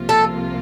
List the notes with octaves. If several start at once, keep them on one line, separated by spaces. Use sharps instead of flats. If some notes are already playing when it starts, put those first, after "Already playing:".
Already playing: C2 C3 F3 A#3 F4
A4